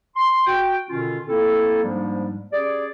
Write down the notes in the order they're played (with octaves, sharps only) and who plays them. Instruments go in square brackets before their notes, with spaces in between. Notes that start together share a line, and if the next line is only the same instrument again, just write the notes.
[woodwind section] C6
F#4 G5
B2 D3 D#3 C#4 F4
A#3 C4 E4 A4
G#2 F3 G3 G#3 A#3 D4
C#4 G4 G#4 D5